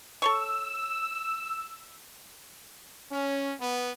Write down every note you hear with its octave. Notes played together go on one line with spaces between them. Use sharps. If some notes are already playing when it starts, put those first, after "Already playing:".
A4 C#5 C#6 E6
C#4
B3